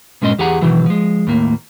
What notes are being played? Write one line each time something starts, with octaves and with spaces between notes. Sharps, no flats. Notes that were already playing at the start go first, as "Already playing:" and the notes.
G2 A#2 G#3 C#4 D#5 C6
E2 G4 G#4 F#5 A#5
B2 D#3 E3 F#3
F3 G#3
D#2 A2 A#3